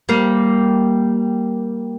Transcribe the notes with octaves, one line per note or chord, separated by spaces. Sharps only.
G3 A#3